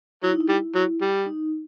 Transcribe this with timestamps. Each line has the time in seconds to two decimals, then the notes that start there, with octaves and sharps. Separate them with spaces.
0.23 F#3 E4
0.32 D#4
0.41 E4
0.49 G3
0.75 F#3
1.01 G3
1.26 D#4